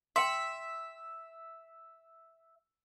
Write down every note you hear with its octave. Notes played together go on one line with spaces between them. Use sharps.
E5 G5 C6